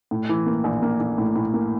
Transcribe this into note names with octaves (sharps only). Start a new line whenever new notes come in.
A2
E3
A#3
A#1
A#3
A#1
A2
A2
A#3